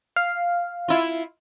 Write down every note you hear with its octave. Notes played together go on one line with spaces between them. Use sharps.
F5
E4 F4